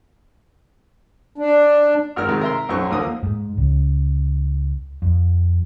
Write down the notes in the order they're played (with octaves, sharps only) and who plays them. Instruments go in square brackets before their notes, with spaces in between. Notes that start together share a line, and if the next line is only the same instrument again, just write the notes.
[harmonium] D4
[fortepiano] G#1 F#4 A#4 F6
C3 D#3 G#3
A#4 E5 C6
B1 F#2 F#3 C5 C#6
D#2 D3 F3 A#3 D#6
[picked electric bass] G#2
C#2
F2